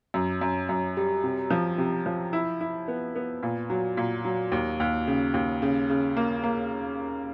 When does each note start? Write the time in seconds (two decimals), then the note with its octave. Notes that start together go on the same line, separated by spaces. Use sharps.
0.14 F#2
0.41 F#2
0.69 F#2
0.97 G3
1.24 C3
1.51 F3
1.78 C3
2.06 F3
2.33 E4
2.61 E4
2.88 B3
3.16 B3
3.43 A#2
3.70 F#3
3.97 A#2
4.25 F#3
4.52 D#2
4.80 D#2
5.07 C#3
5.34 D#2
5.62 C#3
5.90 C#3
6.17 A#3
6.44 A#3